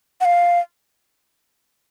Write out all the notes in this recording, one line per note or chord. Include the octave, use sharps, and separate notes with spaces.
F#5
F5